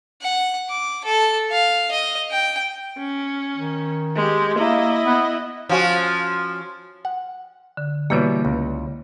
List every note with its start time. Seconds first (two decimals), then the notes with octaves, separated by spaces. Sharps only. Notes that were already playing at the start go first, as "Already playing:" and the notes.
0.22 F#5
0.69 D6
1.05 A4
1.51 F5
1.91 D#5
2.31 G5
2.99 C#4
3.57 D#3
4.16 G#3 G4
4.58 A#3 E4 D#5
5.04 B3
5.69 F3 C#4 F#4
7.05 F#5
7.77 D3
8.10 B2 E3 G3 A#3 E4 C#5
8.45 C#2